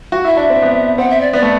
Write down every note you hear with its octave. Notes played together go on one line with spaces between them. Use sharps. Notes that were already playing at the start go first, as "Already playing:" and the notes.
F#4
E4 E5
D4
C4
B3
C4 F#5
E5
D5
B3 D5
A3